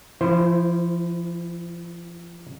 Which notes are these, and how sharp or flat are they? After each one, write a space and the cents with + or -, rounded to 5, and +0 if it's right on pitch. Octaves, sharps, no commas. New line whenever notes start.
F3 -30 E4 +15 C5 +0